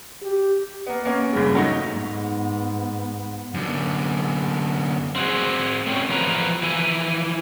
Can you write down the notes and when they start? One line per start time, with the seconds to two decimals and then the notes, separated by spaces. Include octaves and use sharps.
0.22 G4
0.87 A#3 B3
1.05 A#3 B3 C#4
1.33 F#1 G2 C#3
1.55 F#3 A3 D#4
1.90 G#2 B3
3.54 F#2 D3
5.16 C4 F#4 G#4
5.86 A3 C4 C#4
6.09 E3 F3 B3 F4 B4 A#5
6.63 E3 F3 E4 G#5